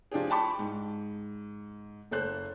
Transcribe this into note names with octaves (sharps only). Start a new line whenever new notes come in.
F3 D4 G4 G#4
G5 A5 B5 C#6
G#2
F#1 A4 C5 F#6